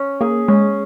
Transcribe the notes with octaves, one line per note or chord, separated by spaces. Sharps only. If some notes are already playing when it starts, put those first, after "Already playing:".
Already playing: C#4
A#3 G#4
G#3 C#4